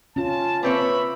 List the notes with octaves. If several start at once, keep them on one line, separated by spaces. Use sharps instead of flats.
C#4 F4 A5
A#3 C4 B4 C#5 E5 B5